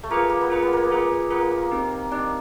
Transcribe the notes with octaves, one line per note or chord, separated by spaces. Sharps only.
A3
A#3 F4 G#4 B4
A#3
B3
A#3 F4 G#4 B4
B3
A#3
B3
A#3 F4 G#4 B4
B3 F4 G#4 B4
A#3
A#3
A#3
C4 D#4 G4
C4 D4 D#4 G4